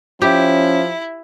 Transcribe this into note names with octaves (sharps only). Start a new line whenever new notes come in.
F3 C#4 E4 G4